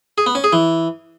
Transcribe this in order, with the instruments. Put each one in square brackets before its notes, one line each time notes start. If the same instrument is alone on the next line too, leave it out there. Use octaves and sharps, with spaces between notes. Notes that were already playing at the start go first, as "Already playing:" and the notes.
[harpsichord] G#4
B3
C#4
G#4
E3